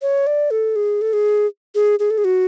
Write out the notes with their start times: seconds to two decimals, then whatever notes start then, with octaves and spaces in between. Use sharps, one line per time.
0.02 C#5
0.27 D5
0.51 A4
0.76 G#4
1.01 A4
1.13 G#4
1.75 G#4
1.99 G#4
2.11 A4
2.18 G#4
2.25 F#4